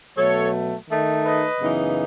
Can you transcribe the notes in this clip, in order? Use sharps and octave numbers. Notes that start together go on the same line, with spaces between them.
B2 F#3 A3 A4 C#5
D#3 A3 D#4
B4 D#5
F#2 C#3 E3 B3 D#4